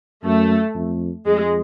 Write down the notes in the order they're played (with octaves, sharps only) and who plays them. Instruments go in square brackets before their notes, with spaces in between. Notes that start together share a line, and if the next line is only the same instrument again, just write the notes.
[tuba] F#2 [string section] A3
[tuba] F2
[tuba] F2 [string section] G#3